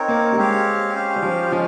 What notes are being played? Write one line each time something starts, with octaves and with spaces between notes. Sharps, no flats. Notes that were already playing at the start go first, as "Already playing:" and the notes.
Already playing: C4 D#4 A#4 C#5
A#3
G3
G#3 C4 G4 C#5 F5
C#4 G4 C5 F5
G3
F3
F3 G#3 C#4 F4